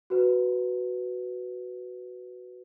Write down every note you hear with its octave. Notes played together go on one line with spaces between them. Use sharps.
F#4 B4